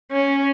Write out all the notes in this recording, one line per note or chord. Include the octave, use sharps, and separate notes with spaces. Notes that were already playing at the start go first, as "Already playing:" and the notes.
C#4